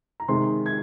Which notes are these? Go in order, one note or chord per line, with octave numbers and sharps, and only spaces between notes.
A#5
C3 D#3 G#3 C6
G#6